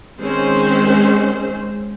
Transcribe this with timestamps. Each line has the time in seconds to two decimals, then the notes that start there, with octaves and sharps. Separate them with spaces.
0.19 D#3 G#3 C4 C#4 C5